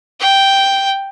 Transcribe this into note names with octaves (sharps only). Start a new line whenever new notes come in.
G5